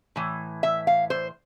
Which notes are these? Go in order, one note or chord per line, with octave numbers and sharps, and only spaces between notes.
A2 E3
E5
F5
C5